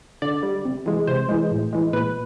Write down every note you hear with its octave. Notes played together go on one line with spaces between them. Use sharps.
D3 D5
G3
C3
E3 G#3
C3 C5
E3 G#3
A2
E3 G#3
A#2 B4